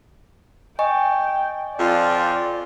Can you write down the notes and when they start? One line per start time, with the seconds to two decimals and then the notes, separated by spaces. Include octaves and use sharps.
0.79 D#5 G5 G#5 C#6
1.77 F2 F4 D5